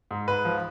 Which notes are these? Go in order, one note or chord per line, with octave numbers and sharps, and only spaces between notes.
G#2
G#2 B4
F3